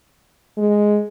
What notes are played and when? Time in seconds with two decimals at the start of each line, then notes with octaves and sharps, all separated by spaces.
0.57 G#3